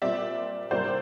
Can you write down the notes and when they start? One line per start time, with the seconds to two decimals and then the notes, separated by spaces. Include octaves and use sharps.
0.02 A#2 G3 C4 D5 E5
0.71 C3 D#3 G3 A#3 C5 D5